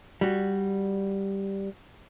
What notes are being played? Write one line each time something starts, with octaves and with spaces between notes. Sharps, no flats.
G3 F#4